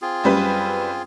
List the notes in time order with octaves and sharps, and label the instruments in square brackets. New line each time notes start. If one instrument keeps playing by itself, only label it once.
[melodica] C4 F4 G#4
[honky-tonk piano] F#2 G3 B4